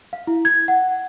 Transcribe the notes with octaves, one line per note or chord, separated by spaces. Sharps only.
F5
E4
G#6
F#5